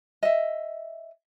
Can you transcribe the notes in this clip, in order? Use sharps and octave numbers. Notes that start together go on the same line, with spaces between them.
D#5 E5